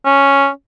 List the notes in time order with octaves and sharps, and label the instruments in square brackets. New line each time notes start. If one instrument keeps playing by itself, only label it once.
[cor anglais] C#4